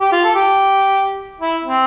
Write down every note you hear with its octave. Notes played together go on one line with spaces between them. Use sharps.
G4
F4
A4
G4
E4
C4